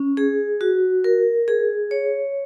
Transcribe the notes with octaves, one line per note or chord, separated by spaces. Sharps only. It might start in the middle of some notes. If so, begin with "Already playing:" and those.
Already playing: C#4
G#4
F#4
A#4
G#4
C#5